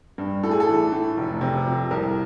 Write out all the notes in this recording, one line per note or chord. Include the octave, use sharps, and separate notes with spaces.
G2
A2 A4
G#4
A4
E3
A2
F1
C3
F2
C2 A#4